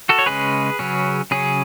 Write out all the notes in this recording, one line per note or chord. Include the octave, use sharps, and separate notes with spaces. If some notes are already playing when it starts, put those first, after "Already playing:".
F#4 A4
C#5
C#3 G#3 C#4 G#4 B4
C#3 F#3 C#4
C#3 F#3 C#4 G#4